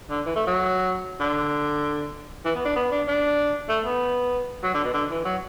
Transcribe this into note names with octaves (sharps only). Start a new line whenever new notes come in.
D3
E3
A3
F#3
D3
E3
B3
D4
B3
D4
D4
A3
B3
F#3
D3
B2
D3
E3
F#3